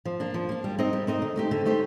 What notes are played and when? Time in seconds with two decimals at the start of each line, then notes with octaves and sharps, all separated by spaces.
0.05 F3
0.20 A#3 D4
0.34 F3
0.49 A#3 D4
0.64 G3
0.78 C4 D#4 A#4 D#5
0.93 G3
1.07 C4 D#4 A#4 D#5
1.22 D3
1.36 A3 D#4 G4 C5
1.51 D3
1.65 A3 D#4 G4 C5